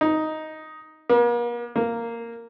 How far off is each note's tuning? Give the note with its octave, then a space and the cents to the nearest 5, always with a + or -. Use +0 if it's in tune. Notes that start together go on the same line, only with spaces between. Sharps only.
D#4 +5
A#3 +45
A#3 -5